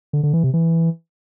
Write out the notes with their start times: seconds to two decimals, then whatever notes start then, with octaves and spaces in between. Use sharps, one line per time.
0.13 D3
0.23 D3
0.33 E3
0.44 C3
0.54 E3